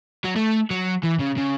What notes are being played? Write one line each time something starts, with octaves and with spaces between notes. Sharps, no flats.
F#3
A3
F#3
E3
C#3
C#3